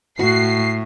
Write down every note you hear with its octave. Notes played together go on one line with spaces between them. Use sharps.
A2 F#4 C7